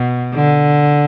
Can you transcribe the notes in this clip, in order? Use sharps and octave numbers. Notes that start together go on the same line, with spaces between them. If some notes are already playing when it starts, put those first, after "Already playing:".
Already playing: B2
D3